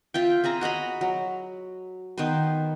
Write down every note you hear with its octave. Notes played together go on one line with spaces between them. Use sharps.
F4 E5 G5
C4 G#4 E5 A#5
F#4 D#5 A#5 B5
F#3
D#3 B3 B4 C5